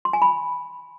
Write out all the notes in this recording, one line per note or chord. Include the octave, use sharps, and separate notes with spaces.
C6
G#5
B5